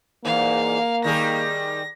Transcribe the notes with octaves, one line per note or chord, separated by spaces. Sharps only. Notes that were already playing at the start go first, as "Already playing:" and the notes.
E2 G#2 A#3 F5
D#3 G3 G#4 A#6